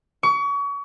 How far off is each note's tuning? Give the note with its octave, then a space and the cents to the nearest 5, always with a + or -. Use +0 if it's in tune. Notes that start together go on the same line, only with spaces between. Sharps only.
C#6 +35